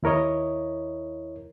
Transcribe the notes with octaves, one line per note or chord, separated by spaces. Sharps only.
D#2 E4 A#4 C#5 D#5